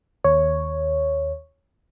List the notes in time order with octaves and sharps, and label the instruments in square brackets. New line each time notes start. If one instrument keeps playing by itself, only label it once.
[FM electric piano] D#2 C#5